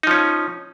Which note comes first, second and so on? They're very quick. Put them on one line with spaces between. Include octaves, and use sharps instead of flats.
D#4 F3 C#4